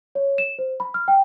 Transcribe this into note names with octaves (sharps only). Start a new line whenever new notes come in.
C#5
E7
C5
B5
F6
G5